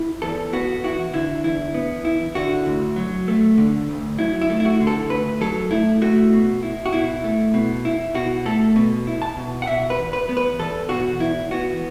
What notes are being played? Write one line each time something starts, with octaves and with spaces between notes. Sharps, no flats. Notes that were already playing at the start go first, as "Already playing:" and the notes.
Already playing: E4
E2 A4
B3 F#4
E4 F#4
D3 E4
E2 E4
B3
E4
D3 F#4
D2
F#3
A3
D3
D2
F#3 E4
E4
A3
E4
F#4
D3
A4
D2 B4
F#3 A4
A3 E4
A3 F#4
B2
E4
F#4
B2 E4
A3
B2
E4
B2 F#4
A3 A4
B2
E4
A5
B2
F#5
B2 E5
B4
E2
B4
B3
B4
E2 A4
B2 F#4
E2 E4
B3 F#4